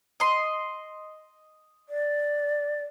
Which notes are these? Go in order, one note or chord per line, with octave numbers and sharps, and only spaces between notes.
D#5 C6
D5